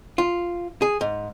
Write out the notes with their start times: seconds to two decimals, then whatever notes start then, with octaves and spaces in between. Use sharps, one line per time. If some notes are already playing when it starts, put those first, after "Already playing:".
0.18 F4
0.82 G#4
1.01 G#2